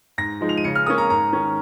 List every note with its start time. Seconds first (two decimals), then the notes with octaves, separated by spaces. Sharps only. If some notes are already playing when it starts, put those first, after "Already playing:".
0.18 G#2 A#6
0.41 F3 G#3 D#4
0.49 F7
0.57 D#7
0.64 C#3 C#7
0.75 F6
0.86 A#3 C#4 D#6
0.98 A#5
1.10 G#2 A#5
1.33 D#3 C#4